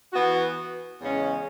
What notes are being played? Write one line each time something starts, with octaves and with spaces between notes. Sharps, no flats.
E3 B3 F#4
E2 C#3 G#3 C#4